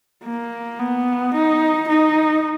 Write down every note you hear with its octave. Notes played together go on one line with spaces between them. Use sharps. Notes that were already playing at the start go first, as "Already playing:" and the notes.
A#3
B3
D#4
D#4